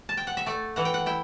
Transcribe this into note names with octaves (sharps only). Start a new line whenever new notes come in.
A5
G5
F#5
E5
A3 D5
E3 F#5
G5
F#5
E4 G5